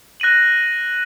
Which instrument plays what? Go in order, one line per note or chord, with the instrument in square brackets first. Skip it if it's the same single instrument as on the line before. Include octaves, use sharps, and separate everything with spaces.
[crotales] F#6 A#6 D#7 F#7